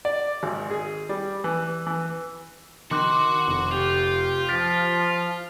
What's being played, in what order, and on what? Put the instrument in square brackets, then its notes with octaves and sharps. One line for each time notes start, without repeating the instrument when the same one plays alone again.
[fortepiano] D5
G#1
G#4
G3
E3
E3
[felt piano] D#3 [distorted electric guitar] F#4 [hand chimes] C6 D6 F#6
[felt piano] F1
[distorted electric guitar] F4 [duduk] G4
[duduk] F3 [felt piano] F6 [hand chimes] A6 B6 D7